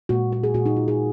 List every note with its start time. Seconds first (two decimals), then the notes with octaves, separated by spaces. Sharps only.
0.09 A#2 G#3 F#4
0.32 F#4
0.43 G#4
0.54 A#2 F#4
0.57 G#3
0.66 D#4
0.76 F4
0.88 G#4